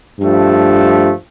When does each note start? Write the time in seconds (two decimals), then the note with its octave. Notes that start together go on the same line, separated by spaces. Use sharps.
0.19 G2 F3 A3